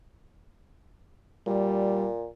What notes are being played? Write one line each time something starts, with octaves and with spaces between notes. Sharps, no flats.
A#2 G3